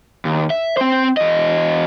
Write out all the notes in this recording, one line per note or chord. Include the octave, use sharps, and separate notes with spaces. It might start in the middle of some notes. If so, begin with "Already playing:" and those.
D#2
E5
C4 C5
E2 D#5